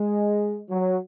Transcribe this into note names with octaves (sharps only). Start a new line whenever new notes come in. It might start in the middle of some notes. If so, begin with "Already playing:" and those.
Already playing: G#3
F#3